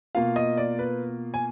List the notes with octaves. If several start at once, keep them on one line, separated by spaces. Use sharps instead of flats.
B2 A#3 F4 F5
D#5
D5
B4
G#5